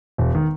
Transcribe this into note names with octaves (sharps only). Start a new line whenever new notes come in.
E1
D#3